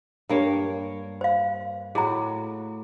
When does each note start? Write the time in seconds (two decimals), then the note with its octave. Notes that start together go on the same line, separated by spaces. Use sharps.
0.29 G2 A#3 C#5
1.21 C5 F5
1.95 A2 F#4 G#4 A#5